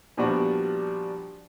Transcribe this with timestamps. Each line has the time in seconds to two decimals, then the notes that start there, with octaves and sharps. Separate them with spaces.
0.17 A#2 F3 G3 B3 D4 F#4